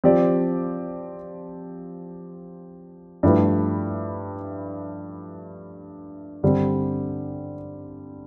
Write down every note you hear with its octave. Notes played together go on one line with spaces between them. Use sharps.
F3 C4 G4 D5
G2 F3 A3 E4 B4
G2 D3 G3 C4